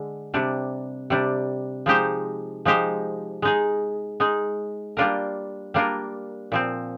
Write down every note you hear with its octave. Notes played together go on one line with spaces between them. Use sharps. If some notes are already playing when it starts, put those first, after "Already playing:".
Already playing: D3 G#3
C3 G3 D4
C3 G3 D4
F3 G#3 D#4 G4 C5
F3 G#3 D#4 G4 C5
G#3 D#4 G#4
G#3 D#4 G#4
G3 A#3 D4 F4 A#4
G3 A#3 D4 F4 A#4
A#2 F3 C4